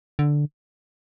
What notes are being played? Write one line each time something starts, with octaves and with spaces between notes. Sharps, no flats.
D3